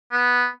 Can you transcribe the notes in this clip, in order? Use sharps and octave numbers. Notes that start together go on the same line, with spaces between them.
B3